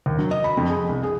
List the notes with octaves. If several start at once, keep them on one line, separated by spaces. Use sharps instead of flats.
D#2
F#3
D#5
B5
F2
G#4
C2
G#4